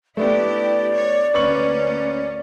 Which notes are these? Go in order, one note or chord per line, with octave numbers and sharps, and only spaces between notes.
A3 B3 D4 E4 G4 D5
C#5
D2 A#3 C#4 B4 C#6 F#7